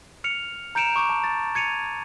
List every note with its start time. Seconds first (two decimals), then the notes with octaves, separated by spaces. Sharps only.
0.24 F6 C#7 F7
0.75 A#5 G6 C#7 D7 E7 F7
0.96 C#6 D6 G6
1.09 A5
1.24 A6
1.55 G#6 C#7 D#7 F7